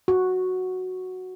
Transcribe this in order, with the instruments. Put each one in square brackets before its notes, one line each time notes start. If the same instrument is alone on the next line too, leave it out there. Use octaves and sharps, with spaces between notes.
[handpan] F#4